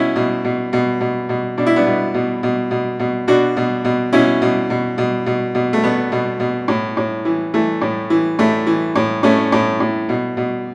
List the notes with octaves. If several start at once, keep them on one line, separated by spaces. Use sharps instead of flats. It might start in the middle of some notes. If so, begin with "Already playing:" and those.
Already playing: B2 C#4 E4
B2
B2
B2
B2
B2
B2 D4
E4
B3 D4
B2
B2
B2
B2
B2
B2 D4 F#4
B2
B2
B2 C#4 E4
B2
B2
B2
B2
B2
A3
B2 B3
B2
B2
A2
A2
E3
E3 A3
A2
E3
A2 A3
E3
A2
A2 A3 C#4
A2
A2
B2
B2